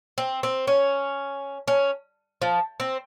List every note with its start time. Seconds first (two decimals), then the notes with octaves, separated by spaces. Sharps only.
0.18 C4
0.43 C4
0.67 C#4
1.68 C#4
2.42 F3
2.80 C4